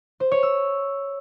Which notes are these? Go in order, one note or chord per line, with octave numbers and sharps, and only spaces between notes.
C5
C#5
E6